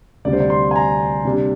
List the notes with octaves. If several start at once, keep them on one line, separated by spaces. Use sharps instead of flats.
D2 C3 G3 D4 D5
C5
D5
C6
G#5
A#5
C3 G3 A#3 D4